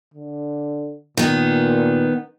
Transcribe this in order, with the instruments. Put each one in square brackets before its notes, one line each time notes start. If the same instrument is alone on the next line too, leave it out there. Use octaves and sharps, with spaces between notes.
[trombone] D3
[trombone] A#2 [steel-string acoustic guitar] D#3 B3